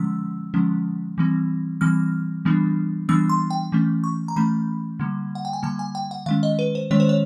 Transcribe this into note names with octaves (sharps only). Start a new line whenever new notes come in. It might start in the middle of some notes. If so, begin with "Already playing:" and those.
Already playing: D3 F3 G#3 C#4 E6
D3 F3 G#3 C#4
E3 G3 C4
E3 G3 C4 F6
E3 G3 B3 D4
E3 G3 B3 D4 E6
C6
G5
E3 A3 C#4
C#6
A#5
E3 A3 C#4 B5
D3 G3 A#3
F#5
G5
G#5
D3 G3 A#3 A5
G#5
G5
F#5
D#3 G#3 C#4 F5
D#5
B4
C5
D#3 G#3 C#4 C#5
C5
C#5